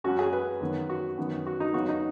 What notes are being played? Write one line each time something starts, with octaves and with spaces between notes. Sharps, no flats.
F#2 F#3 C#4 F#4
G#4
B4
F#2 D#3 B3
F#4
F#2 D#3 B3
F#4
D#4
F#2 C#3 B3 F#4
D#4